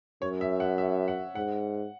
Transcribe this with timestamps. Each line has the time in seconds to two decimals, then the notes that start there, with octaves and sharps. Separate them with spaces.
0.22 F#2 C#5
0.41 E5
0.60 F#5
0.78 E5
1.08 F#5
1.35 G#2 F#5